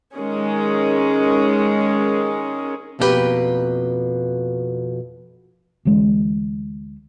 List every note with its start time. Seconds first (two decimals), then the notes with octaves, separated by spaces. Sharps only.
0.16 D#3 G#3 C#4 G#4
2.99 F2 B2 A#3 D4 G4 B4
5.85 D2 E3 G#3 C#4